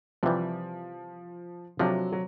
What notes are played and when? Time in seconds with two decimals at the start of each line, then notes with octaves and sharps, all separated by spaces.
0.23 C3 E3 F3 G3
1.79 C3 F3 F#3 A3 D4
2.12 F#3